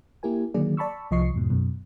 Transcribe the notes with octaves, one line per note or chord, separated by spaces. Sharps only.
A#3 E4 G4 A#4 G#5
D3 D#3 F#3 A#3 G#4 D5
D5 A5 B5 C#6 E6
C2 F3 D#5 C#6 C7
E2 G#2 B2
F#2 B2